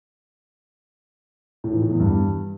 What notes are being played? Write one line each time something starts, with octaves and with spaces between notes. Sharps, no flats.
A2
E3
A2
E2
G2